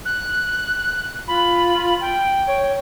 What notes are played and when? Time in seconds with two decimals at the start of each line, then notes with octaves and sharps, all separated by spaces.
0.05 F#6
1.27 F4 B5
2.00 G5
2.48 C#5